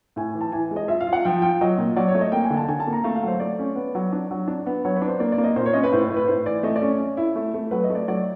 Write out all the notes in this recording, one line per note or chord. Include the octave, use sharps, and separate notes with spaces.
A2 G#5
E3
A5
E3 G#5
G#3
D#5
F4 E5
F5
F4
F#5
F3 G5
F4 G5
F#3 D#5
A#2
F#3 D5
C#5
A3
D#5
A#3 G5
G#5
D3
A5
D3 G#5
A5
A#3
A#5
A3 F5
F5
F#3 C5
A3 D5
C#4
B3
F#3
D4
F#3
D4
B3
F#3 C#5
B4
D4
C5
A#3 D5
D5
A#3
D#5
A#2 C5
C#5
C#4 D#5
B4
A2 C5
B4
A2
B4
A2 C5
E3 D5
A3 D#5
D5
C#4
C#4
E4
A3
A3
F#3 B4
D#5
A3
D5
F#3 D5